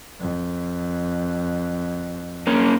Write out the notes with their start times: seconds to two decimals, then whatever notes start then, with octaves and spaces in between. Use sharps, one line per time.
0.19 F2
2.47 A#3 C#4